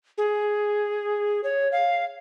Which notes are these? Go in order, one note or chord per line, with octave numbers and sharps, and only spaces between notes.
G#4
C#5
F5